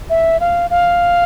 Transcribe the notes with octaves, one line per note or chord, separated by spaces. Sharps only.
E5
F5
F5